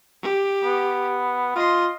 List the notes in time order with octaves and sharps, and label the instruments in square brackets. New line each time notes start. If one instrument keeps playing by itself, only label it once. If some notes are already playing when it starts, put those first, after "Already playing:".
[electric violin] G4
[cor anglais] B3
[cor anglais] F4 [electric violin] D#5 C6